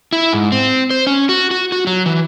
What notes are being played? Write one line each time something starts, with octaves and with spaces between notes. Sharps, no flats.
E4
G#2
C4
C5
C#4
F#4
F#4
F#4
F#3
E3